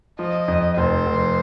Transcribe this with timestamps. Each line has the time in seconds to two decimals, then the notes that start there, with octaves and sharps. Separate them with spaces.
0.19 F3 D#5
0.48 F2
0.77 F1 C5
1.06 F1